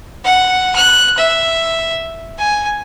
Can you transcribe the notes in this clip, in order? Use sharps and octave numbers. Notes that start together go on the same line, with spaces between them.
F#5
F#6
E5
G#5